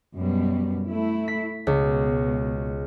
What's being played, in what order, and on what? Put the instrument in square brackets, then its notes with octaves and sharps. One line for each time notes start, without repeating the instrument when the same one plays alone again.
[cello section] F#2 B2 G3
A3 E4
[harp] B6
[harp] C#2 [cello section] B2 G#3